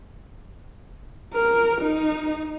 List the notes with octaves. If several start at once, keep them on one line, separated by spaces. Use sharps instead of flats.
A#4
D#4